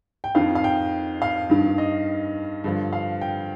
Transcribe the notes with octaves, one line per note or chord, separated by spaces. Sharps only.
G5
F2 D#3 F5
F5
G5
F5
G2 D#3
D#5
G2 D3 F3
F5
G5